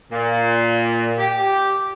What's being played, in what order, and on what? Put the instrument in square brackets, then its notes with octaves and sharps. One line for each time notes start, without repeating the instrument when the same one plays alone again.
[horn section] A#2
G4